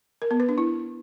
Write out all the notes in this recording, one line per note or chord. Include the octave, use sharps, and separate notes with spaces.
A#4
B3
B4
D4
E4